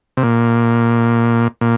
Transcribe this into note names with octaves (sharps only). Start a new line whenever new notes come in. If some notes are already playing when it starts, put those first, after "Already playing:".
C3
A#2
A#2